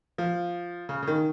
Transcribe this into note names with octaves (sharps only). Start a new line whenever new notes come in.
F3
C#3
C#3
D#3